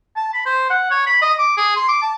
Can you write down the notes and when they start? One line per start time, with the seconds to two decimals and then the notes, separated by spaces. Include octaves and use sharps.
0.16 A5
0.34 B5
0.46 C5
0.70 F#5
0.91 C#5
1.07 B5
1.22 D#5
1.39 D6
1.57 G#4
1.76 C6
1.88 D6
2.02 A5